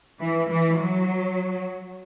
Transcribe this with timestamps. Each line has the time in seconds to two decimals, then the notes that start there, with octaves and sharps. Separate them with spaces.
0.20 E3
0.49 E3
0.78 F#3